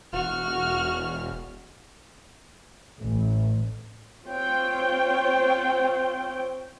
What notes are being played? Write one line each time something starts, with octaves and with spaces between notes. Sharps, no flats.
E1 F#4 F6
A1
C4 F4 C5 C#5 G5